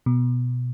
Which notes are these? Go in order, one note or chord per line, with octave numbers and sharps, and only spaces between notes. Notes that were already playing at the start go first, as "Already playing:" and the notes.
B2